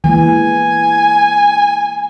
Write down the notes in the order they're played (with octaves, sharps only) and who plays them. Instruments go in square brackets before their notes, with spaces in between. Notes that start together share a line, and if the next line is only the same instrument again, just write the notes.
[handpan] E3 G#3 A#3 [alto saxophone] G#5